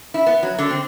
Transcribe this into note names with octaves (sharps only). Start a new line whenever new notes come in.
E4
B3
F#3
D3
C4